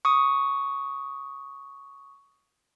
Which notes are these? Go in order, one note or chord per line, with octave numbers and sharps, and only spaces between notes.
C#6 D#6